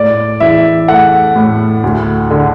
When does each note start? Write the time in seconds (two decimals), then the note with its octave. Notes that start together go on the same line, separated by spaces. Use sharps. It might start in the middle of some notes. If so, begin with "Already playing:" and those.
Already playing: A2 D5
0.40 E3 E5
0.88 A3 F#5
1.35 A2
1.83 D2
2.31 D3